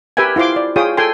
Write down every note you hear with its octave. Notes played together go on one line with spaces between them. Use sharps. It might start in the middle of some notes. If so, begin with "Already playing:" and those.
G4 A#4 B4 E5 G5 G#5
E4 F4 C5 C6 D6
D5
F4 G#4 C#5 G5 D#6
A4 G5 G#5 C6